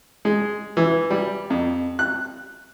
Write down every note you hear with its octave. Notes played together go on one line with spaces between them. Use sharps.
G#3
E3
G3
F2
F#6